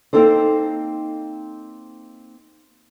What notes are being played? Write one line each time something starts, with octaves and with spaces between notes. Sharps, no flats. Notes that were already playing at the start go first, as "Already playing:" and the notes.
A#3 C4 D#4 A4 C5